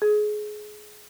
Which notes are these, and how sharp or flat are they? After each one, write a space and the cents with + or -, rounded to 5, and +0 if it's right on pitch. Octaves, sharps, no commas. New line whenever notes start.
G#4 +25